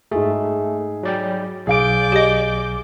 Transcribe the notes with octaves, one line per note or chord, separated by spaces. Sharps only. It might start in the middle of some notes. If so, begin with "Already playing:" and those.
G#2 A3 G#4
F#3 D5 G5
B1 G#4 D5 F5 D6 G6 D7
G4 D#5